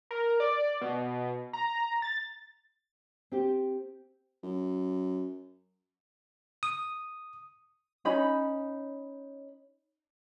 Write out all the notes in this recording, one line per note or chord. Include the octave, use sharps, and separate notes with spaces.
A#4
D5
B2
A#5
A6
C4 G4
F#2
D#6
C#4 D#4 B5